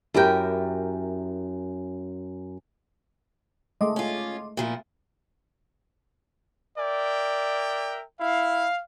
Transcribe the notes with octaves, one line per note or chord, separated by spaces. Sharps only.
F#2 E4 G4 A#4 G5
G#3 A3 D#5 C6 D6
C#4 F4
A#2 F3 E4
A#4 D5 E5 G5
E4 F5